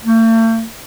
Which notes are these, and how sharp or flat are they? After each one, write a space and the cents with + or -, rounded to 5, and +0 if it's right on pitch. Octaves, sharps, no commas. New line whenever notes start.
A3 +45